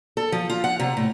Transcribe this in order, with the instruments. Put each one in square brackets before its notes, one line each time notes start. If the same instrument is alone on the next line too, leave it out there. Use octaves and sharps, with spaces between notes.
[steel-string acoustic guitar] A4
F3
F4
F#5
C3
A2